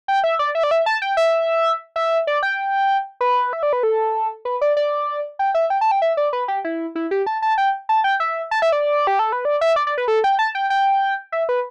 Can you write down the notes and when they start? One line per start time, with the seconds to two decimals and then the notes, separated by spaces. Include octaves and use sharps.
0.08 G5
0.24 E5
0.39 D5
0.55 E5
0.63 D5
0.71 E5
0.86 A5
1.02 G5
1.17 E5
1.96 E5
2.27 D5
2.43 G5
3.21 B4
3.53 E5
3.63 D5
3.73 B4
3.83 A4
4.45 B4
4.61 D5
4.77 D5
5.39 G5
5.54 E5
5.70 G5
5.81 A5
5.91 G5
6.02 E5
6.17 D5
6.33 B4
6.48 G4
6.64 E4
6.95 E4
7.11 G4
7.27 A5
7.42 A5
7.58 G5
7.89 A5
8.04 G5
8.20 E5
8.51 A5
8.62 E5
8.72 D5
9.07 G4
9.19 A4
9.32 B4
9.45 D5
9.61 E5
9.76 D5
9.87 D5
9.98 B4
10.08 A4
10.24 G5
10.39 A5
10.55 G5
10.70 G5
11.32 E5
11.49 B4